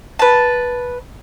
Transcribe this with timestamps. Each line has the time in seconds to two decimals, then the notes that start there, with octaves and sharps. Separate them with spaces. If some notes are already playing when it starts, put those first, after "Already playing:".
0.19 B4 A5